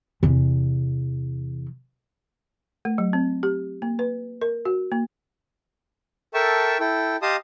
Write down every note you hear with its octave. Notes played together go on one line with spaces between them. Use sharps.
E2 C3
A3
F#3
C4
G4
A#3
B4
A#4
F#4
A#3
A4 A#4 E5 G5 A5 C#6
E4 A4 G5
G4 D#5 F5 A5 C6 D#6